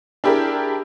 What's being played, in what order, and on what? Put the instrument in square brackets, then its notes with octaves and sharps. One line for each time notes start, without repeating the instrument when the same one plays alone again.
[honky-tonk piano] D4 E4 G4 G#4 A#4